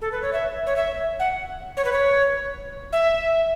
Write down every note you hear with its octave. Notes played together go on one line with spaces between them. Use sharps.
A4
B4
C#5
E5
C#5
E5
F#5
C#5
B4
C#5
E5